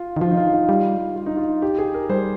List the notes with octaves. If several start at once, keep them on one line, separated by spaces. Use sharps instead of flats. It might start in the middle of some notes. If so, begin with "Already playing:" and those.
Already playing: F4
D#3
F3 F4
D#4
F4
F4
G3
F4
D#4
F4
G4
G#4
A#4
G3 C5